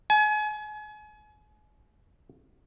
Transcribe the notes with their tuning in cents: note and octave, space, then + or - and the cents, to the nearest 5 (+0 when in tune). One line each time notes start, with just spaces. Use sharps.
G#5 +35